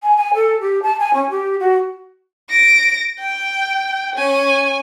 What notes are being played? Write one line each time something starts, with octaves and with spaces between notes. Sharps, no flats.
G#5
G#5
A4
G4
A5
G#5
C#4
G4
F#4
A#6 D7
G5
C#4 G#5